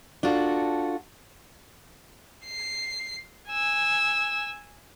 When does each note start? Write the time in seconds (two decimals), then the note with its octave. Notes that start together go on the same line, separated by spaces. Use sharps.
0.23 D4 F4 F#4 A4
2.46 C7
3.50 G#5 E6